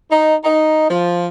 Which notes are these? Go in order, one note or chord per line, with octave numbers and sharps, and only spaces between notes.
D#4
D#4
F3